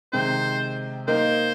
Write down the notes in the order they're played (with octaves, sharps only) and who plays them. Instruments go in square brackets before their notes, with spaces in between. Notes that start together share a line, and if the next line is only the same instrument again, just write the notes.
[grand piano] C3 D#3 G#3 C4 [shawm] C5
[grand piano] A#3 D#4 A#4 D#5 [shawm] C5